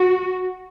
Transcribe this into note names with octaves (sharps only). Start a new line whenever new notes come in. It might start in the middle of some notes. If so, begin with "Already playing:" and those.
Already playing: F#4